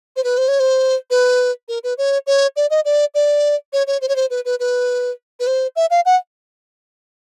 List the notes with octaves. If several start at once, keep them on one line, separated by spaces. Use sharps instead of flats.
C5
B4
C5
C#5
C5
B4
A#4
B4
C#5
C#5
D5
D#5
D5
D5
C#5
C#5
C5
C#5
C5
B4
B4
B4
B4
C5
E5
F5
F#5